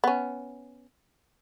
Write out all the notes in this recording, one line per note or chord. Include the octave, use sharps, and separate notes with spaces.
B3 C#4